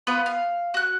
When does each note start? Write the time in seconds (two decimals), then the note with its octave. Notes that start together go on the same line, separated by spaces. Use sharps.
0.07 B3 F4 B4
0.26 F5
0.74 F#4 F#6